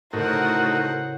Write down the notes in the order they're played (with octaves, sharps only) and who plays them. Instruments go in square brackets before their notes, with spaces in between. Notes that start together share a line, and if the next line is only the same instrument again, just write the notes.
[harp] A2 C#3 [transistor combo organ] A3 D#4 F#4 [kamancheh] A#4 [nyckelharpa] C5 F#5